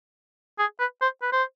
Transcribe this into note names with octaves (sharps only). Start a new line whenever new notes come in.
G#4
B4
C5
B4
C5